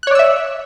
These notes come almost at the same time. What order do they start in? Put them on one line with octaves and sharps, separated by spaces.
F#6 C#5 D5 E6 E5